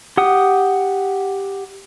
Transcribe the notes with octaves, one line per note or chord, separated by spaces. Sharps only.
G4 F#5 D#6